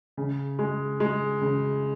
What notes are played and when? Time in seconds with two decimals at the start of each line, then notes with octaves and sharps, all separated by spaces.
0.17 C#3
0.59 G#3
1.00 G#3
1.41 C#3